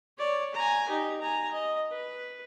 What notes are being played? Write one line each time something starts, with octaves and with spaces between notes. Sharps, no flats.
C#5 D5
G#5 A#5
D#4 G4
G#5 A#5
D#5
B4